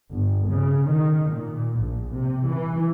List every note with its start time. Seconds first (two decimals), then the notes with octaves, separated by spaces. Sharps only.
0.11 G1
0.50 C#3
0.89 D#3
1.29 A#2
1.79 A#1
2.12 C3
2.46 E3